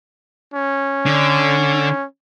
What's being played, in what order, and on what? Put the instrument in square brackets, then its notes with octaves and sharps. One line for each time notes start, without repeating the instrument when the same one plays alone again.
[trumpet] C#4
[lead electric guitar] D3